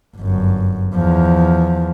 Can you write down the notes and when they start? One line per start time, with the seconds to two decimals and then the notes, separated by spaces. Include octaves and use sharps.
0.17 G1 F#2
0.95 E2 F3